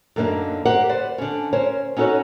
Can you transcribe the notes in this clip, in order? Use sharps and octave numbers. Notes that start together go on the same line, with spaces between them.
F#2 D3 A#3 C#4 D#4
G4 A#4 C5 F#5
B4 C5 D5
D3 C#4
C#4 A#4 C5 C#5
C#4 D#4 F#4 A4 B4 C#5